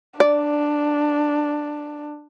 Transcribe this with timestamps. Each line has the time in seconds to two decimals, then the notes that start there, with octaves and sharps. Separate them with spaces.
0.20 D4 D5